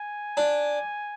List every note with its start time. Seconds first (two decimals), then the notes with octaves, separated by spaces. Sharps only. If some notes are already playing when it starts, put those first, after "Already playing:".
Already playing: G#5
0.37 D4